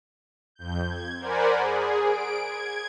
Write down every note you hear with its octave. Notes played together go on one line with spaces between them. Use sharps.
F2 G6
G#6
A#4 C5 D5 F#5 G#5 B5
G#4
D7
G#6